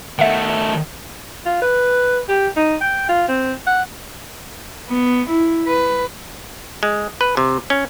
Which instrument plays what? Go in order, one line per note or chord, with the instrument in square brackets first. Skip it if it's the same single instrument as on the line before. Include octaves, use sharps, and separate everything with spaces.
[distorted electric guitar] D#3 A3 [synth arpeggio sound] E5 F#5
[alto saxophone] F4
B4
G4
D#4
G5
F4
C4
F#5
[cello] B3
E4
B4
[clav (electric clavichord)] G#3
B4
C3
C#4